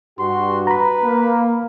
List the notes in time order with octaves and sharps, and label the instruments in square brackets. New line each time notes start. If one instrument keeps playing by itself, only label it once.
[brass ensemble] G2 F#4 [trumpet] C6
[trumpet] B4 [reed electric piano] A#5 B5
[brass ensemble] A#3